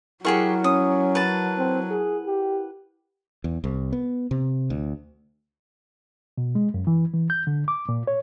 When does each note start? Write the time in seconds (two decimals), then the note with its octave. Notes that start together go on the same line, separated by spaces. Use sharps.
0.25 F#3 E4 G4 G#4 A#4 F#5 C#6
0.64 C#4 D#6
1.15 B4 A5
1.58 C4
1.91 G#4
2.27 G4
3.44 E2
3.64 C2
3.93 B3
4.31 C3
4.70 D2
6.38 B2
6.55 G#3
6.74 F#2
6.87 E3
7.14 E3
7.30 G6
7.47 D3
7.68 D6
7.89 A#2
8.07 C#5